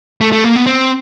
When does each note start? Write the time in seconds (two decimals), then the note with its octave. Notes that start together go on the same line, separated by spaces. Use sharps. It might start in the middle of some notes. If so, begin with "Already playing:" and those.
0.21 A3
0.32 A3
0.44 A#3
0.56 B3
0.66 C4